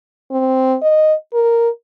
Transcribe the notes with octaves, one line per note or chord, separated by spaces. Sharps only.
C4
D#5
A#4